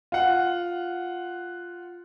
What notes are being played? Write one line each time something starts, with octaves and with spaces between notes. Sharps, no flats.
F4 F#5